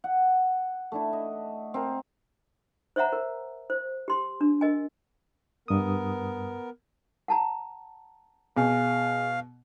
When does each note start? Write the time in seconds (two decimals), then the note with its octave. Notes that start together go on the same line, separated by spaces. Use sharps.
0.04 F#5
0.92 A3 D4 E4
1.13 D#5
1.74 C4 A#4
2.96 C5 C#5 E5 F#5 A#5
3.13 A#4
3.70 C5
4.08 G4 C6
4.41 D4
4.61 A#4 D#5 G#5
5.68 G2 B3 A#4 D#6
7.28 F#5 A5 A#5
8.57 B2 G#4 F5 G#5